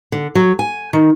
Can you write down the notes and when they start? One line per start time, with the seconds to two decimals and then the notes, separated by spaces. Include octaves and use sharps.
0.12 D3
0.35 F#3
0.59 G#5
0.93 D#3